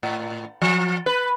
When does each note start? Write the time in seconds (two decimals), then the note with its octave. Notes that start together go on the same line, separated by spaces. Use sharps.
0.03 A2
0.62 F3
1.06 B4